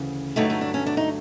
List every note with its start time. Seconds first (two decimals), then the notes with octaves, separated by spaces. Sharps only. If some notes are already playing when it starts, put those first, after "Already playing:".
Already playing: D2 C#3 E3
0.36 G2 D3 F#3 A3 D#4
0.50 D#4
0.61 D4
0.74 C#4
0.86 D4
0.97 D#4